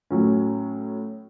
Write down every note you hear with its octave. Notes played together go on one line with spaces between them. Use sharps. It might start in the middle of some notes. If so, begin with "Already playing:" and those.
A2 F#3 C#4